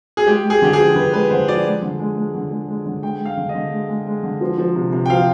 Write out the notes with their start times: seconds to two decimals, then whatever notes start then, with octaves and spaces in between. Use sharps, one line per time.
0.17 G#4
0.27 G#3 G4
0.44 G#3
0.50 G#4
0.62 D3 G4
0.73 G#4
0.79 F3
0.96 D3 B4
1.13 G#3 B4
1.31 D3 C5
1.48 F3 D5
1.65 G#3
1.82 D3
2.00 G#3
2.17 G#3
2.35 D3
2.51 G#3
2.69 G#3
2.86 D3
3.03 G#3 G5
3.20 G#3
3.25 F5
3.38 D3
3.49 D#5
3.55 D3
3.72 G#3
3.89 G#3
4.06 G#3
4.23 D3
4.41 F3
4.58 F3
4.76 C3
4.93 C3
5.06 G5
5.10 F3 F5